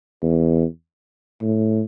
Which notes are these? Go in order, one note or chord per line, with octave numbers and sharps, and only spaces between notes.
E2
A2